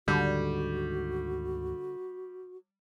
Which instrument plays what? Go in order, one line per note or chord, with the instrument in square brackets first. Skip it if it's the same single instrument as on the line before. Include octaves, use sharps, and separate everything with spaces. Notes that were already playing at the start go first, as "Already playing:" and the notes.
[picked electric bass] D2 G#2 D#3 [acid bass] D3 [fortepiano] G3 [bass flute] F#4